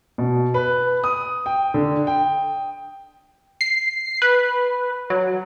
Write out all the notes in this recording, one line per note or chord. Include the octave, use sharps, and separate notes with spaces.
B2
B4
D#6
G5
D3
G5
C7
B4
F#3